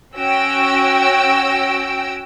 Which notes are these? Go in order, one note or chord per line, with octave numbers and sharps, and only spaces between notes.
C#4 F#4 G5 E6 A#6 D7